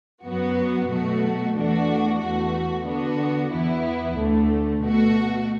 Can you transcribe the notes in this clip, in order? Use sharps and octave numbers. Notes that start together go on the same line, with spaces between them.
F#2 F#3 B3 F#4
B2 F#3 A3 F#4
E2 E3 A3 D4 F#4
E2 E3 A3 F#4
D3 B3 D4 F#4
E2 E3 B3 E4
D2 D3 A3
B2 A3 F#4